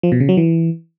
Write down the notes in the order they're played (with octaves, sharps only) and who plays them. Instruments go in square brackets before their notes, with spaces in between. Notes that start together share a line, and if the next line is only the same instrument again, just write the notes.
[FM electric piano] F3
B2
C#3
F#3
E3